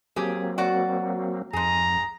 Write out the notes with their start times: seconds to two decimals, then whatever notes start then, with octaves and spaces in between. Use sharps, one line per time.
0.16 F#3 A#3 C4 G4 G#4
0.58 F#4 D5 F#5
1.53 F2 G#2 G#4 A#5